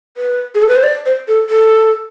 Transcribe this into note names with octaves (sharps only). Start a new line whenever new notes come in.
B4
G#4
A4
B4
C5
D5
C5
A4
A4